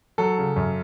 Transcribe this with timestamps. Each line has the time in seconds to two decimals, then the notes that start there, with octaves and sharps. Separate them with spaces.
0.18 F#3 A4
0.38 C#3
0.56 F#2